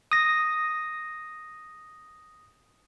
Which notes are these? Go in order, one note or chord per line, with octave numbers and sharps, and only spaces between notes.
D#6 A#6